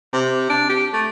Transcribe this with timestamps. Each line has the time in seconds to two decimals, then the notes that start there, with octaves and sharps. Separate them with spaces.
0.13 C3
0.50 D4
0.69 G4
0.93 A3